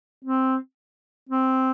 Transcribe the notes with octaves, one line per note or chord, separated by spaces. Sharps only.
C4
C4